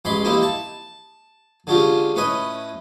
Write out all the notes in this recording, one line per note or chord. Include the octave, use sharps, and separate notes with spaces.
A1 G#3 B5 C6 D6
A#3 C4 D#4 E4 G4
A5
D3 G#3 C#4 F4 G4
A2 C#4 B4 D#5 D#6